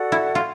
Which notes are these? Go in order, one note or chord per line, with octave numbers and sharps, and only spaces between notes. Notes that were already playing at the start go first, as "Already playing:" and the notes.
Already playing: F#4 A4 D5 F#5
E4
F4